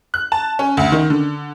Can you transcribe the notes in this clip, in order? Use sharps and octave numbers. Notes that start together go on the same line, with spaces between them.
F#6
A5
C#4
D2
D#3
D3